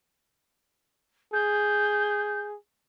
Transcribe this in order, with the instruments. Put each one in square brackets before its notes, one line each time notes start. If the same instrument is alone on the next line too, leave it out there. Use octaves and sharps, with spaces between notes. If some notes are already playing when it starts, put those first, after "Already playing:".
[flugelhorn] G#4 [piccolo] G6